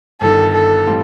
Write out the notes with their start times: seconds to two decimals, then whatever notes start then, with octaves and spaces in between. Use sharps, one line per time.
0.21 G1 G2 D#3 A4
0.54 A4
0.86 A2 E3 G3 C4 F4